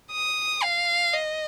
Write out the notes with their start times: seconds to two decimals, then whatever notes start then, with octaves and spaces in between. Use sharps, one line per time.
0.12 D#6
0.63 F5
1.14 D#5